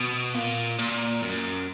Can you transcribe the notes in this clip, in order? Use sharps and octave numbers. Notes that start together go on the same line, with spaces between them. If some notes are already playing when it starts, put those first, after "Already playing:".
Already playing: B2
A#2
A#2
F#2